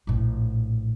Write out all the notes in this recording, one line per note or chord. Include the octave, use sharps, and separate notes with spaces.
A#1 A2